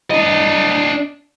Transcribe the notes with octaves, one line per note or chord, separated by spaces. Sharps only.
D4 D#5